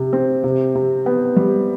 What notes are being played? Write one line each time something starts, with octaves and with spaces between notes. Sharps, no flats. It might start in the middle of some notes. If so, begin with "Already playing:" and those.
Already playing: C3
C4
C3
C3
B3
G3